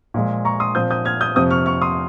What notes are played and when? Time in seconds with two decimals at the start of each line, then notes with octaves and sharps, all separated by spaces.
0.14 A#2 F3 G#3
0.45 A#5 C#6
0.60 C6 D#6
0.75 A#2 F3 C4 D#6 G6
0.91 D#6 G6
1.05 F6 G#6
1.21 D#6 G6
1.36 F2 C3 F3 D#6 G6
1.51 C#6 F6
1.66 C#6 F6
1.81 C6 D#6